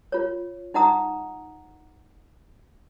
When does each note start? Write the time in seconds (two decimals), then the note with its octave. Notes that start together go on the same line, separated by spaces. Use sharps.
0.12 F4 C#5
0.74 D#4 D#5 F#5 A#5 D#6